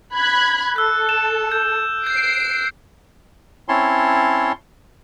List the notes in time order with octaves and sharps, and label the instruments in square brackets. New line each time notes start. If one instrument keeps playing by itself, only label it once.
[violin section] B5 F#6 G#6
[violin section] A4 [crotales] E6 F#6
[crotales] E7
G6
[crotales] G6 [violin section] C7 D7
[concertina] C4 C#4 E4 C#5 A5 C6